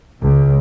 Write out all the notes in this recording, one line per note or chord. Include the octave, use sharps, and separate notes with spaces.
C#2